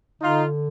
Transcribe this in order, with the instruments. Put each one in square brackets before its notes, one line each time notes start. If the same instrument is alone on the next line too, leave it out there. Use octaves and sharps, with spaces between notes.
[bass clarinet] D3 [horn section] D#4 F4